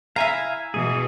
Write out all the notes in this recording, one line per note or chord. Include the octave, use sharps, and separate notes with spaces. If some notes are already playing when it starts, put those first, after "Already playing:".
E4 E5 F5 G#5 A#5
B2 E3 G#4